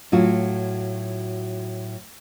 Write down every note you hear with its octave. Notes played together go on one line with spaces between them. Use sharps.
A2 F#3 F4 F#4